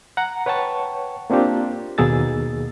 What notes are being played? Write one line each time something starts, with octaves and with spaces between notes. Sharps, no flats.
F#5 A#5
B4 C#5 F#5 G5 A5 C#6
A#3 C4 D4 F4 G4
D#2 B2 A#3 G#4 E6 A6